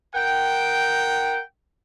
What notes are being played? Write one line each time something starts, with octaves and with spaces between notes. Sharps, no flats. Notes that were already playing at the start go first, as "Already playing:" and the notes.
A#4 F#5 G5